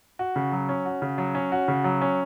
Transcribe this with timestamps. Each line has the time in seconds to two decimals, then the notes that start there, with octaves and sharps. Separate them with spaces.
0.19 F#4
0.36 C#3
0.52 F#3
0.69 C#4
0.86 F#4
1.02 C#3
1.18 F#3
1.35 C#4
1.52 F#4
1.68 C#3
1.84 F#3
2.02 C#4